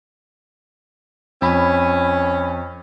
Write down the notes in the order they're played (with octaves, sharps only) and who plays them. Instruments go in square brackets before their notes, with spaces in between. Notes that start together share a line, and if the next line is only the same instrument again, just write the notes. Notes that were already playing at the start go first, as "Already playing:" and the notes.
[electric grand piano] F2 B5 [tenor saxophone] C#4